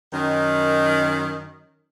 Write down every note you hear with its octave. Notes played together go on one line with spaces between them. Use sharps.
F#2 D#3